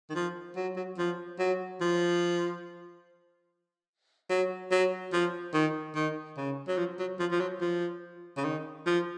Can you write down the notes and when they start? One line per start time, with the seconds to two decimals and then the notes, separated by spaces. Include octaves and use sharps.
0.10 D#3
0.15 F3
0.56 F#3
0.77 F#3
0.98 F3
1.39 F#3
1.81 F3
4.30 F#3
4.71 F#3
5.13 F3
5.54 D#3
5.95 D#3
6.37 C#3
6.68 F#3
6.78 F3
6.99 F#3
7.20 F3
7.31 F3
7.40 F#3
7.61 F3
8.37 C#3
8.44 D#3
8.86 F3